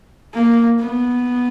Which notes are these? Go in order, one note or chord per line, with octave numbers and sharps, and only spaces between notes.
A#3
B3